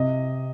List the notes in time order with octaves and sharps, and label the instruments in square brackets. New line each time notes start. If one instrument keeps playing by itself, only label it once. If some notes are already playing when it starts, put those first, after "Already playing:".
Already playing: [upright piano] C3 D#5